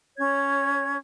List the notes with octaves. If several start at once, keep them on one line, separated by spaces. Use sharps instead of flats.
C#4 C#5 G#6